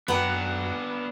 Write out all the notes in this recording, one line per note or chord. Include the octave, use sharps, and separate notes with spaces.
F#2 B3 D4 B4 F#5 G5 A#5 B5